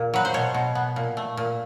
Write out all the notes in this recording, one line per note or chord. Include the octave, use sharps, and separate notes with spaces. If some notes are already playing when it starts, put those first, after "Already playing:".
Already playing: A#2
F#3 B4
C5
B2 C#5
B2
B3
A#2
A3
A#2